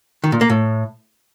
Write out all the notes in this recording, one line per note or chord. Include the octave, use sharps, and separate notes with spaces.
D#3
A#2
A#3
A2